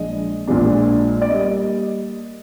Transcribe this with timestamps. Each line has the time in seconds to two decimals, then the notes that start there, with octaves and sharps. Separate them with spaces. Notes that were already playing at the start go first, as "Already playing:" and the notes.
Already playing: A#1 A#2 F3 G#3 D4 D#5
0.47 A#1 A#2 F3 G#3 D4
1.22 D5
1.30 G3 A#3 D#5